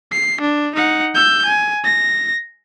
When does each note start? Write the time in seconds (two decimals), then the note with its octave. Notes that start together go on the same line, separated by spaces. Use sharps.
0.12 C7
0.41 D4
0.75 D#4 F#5
1.15 E6 G6
1.46 G#5
1.84 A#6